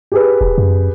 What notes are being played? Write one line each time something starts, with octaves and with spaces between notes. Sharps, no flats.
G4 G#4 B4
E1
F#2